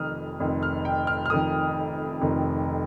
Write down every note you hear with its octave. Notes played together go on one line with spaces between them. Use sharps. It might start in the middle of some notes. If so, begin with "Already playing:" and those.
Already playing: F1 F2 D#3 D#6 F6
F1 F2 D#3
F6
G5
F6
F6
F1 F2 D#3 D#6
F1 F2 D#3